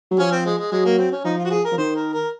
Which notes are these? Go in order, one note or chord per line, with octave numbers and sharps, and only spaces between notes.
F#3
F3 C#4
C4
G#3
G#3
F#3 G#3
A#3
C4
C#4
F3 D#4
F4
F#4
G#4
A#4
F3
D#3 C5
A#4
A#4